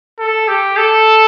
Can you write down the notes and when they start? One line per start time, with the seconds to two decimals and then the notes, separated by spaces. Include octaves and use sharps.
0.19 A4
0.48 G4
0.77 A4